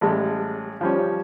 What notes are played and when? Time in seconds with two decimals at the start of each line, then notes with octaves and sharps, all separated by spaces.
0.01 A1 G3 G#3
0.81 F3 G3 C#4